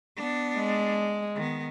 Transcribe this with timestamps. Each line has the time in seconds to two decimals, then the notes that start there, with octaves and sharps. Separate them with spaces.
0.16 B3 D4
0.57 G#3
1.35 D#3 B3